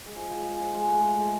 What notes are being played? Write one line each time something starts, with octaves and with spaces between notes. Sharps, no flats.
G#3
F3
F3
G#3
F3
G#3
A3
G#3
A3